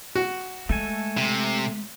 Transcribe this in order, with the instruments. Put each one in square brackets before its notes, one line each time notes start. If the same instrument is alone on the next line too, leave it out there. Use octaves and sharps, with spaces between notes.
[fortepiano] F#4
[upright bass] G#3 [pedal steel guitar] A3 A4 G#5
[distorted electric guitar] C3